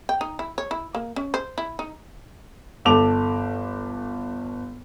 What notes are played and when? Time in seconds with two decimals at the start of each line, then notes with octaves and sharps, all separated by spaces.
0.09 G5
0.21 D#4
0.39 E4
0.58 C#5
0.71 E4
0.95 A#3
1.16 C#4
1.34 C5
1.58 E4
1.79 D#4
2.85 G1 A4 D6 F7